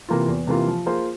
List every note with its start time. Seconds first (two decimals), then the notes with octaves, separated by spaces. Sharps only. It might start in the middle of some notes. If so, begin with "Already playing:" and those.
0.09 C3 E3 A#3 F4
0.28 E2
0.47 C3 E3 A#3 F4
0.68 F3
0.86 A#3 F4 G#4 C5